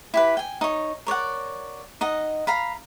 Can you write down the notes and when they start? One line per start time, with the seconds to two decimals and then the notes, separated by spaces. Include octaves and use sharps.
0.14 E4 G4 B4
0.37 G5 G#5
0.61 D#4 C#5
1.07 A#4 C#5 D5 F#5
2.01 D#4 D#5 F#5
2.47 F5 A#5 B5